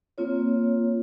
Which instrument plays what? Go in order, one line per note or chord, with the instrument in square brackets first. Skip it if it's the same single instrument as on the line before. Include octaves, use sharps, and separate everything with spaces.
[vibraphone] A#3 C4 F4 C#5